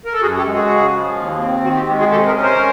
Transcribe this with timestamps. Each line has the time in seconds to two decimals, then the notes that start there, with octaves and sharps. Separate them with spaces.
0.05 A#4
0.13 A4
0.22 F#2 F#4 G#4
0.37 G4 A4
0.45 G#3
0.54 F#4 G#4
0.69 C#3
0.93 F3
1.17 D#2
1.40 C4
1.64 D#3 F#4
1.76 G4
1.87 G#3 G4
1.99 F#4 G#4
2.11 C3 G4 A4
2.27 G#4 A#4
2.35 C#4
2.43 A#4 C5